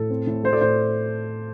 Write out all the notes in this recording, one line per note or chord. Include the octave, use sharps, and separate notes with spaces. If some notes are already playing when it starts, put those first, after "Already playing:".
Already playing: A2 A4
C4
A2
A3 C5
A4 D5
A2 C5